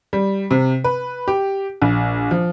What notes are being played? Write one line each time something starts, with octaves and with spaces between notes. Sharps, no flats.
G3
C3
B4
G4
A#1
F3